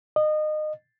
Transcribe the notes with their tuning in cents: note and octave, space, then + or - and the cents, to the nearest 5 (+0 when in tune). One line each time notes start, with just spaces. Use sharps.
D#5 -25